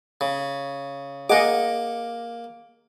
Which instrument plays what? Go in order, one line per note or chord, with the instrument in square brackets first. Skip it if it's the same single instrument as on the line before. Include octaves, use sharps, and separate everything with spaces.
[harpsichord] C#3
[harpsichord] A#3 D6 [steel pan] G#4 D#5 F#5